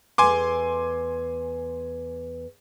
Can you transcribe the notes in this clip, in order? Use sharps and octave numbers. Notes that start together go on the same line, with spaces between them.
E2 A3 G#5 C6 D6